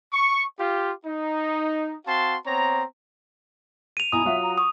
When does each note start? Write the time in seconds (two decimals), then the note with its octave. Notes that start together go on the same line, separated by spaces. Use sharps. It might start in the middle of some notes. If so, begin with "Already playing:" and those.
0.12 C#6
0.58 F4 G4
1.05 D#4
2.06 C4 F#4 F5 A5 C6
2.46 B3 C4 C#5 A#5
3.97 D#7 F7
4.12 B1 E4 G#5 A#5 D#6
4.25 F#3 F4 F#4 E5
4.42 A#5
4.58 C#6 D#6